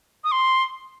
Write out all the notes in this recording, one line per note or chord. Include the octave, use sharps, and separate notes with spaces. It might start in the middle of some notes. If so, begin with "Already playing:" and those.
D#6
C6